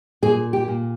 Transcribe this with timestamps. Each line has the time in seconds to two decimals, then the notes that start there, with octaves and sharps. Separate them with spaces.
0.22 A#2 G#4
0.53 G4
0.68 A#2